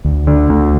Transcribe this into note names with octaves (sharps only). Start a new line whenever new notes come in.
D2
D3
D2